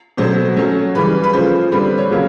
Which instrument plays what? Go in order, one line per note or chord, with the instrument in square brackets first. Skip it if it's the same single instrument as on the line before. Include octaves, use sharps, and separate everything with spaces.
[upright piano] B2 F#3 A3 C4 C5
F#3 A3 C#4 C#5
C#3 E3 G3 B4
B4
C#3 F3 A3 C5
D3 G3 C4 B4
C#5
C#3 F#3 A#3 C#4